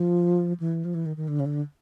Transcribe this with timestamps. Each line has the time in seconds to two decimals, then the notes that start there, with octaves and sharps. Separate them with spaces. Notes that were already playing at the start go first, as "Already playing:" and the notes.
Already playing: F3
0.60 E3
0.85 F3
0.95 E3
1.06 D#3
1.17 D#3
1.28 D3
1.40 C#3
1.46 D3